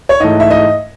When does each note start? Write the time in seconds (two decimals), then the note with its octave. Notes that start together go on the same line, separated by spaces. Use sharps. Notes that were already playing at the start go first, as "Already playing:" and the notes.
0.09 C#5
0.20 G#2 E3 A3 D#5
0.40 E5
0.51 D#5